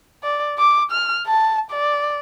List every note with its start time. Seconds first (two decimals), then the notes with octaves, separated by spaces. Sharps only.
0.23 D5
0.58 D6
0.92 F6
1.27 A5
1.71 D5